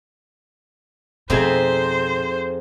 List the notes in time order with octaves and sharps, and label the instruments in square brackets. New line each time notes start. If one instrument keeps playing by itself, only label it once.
[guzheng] F2 D#4 E5 [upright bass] B2 [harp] C4 G#4 [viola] C5